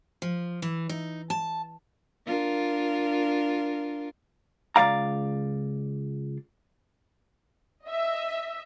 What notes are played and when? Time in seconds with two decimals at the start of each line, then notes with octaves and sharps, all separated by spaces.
0.22 F3
0.62 E3
0.89 D#4
1.30 A5
2.26 D4 F4 A#4
4.76 C#2 C#3 D5 F5 A#5
7.84 D#5 E5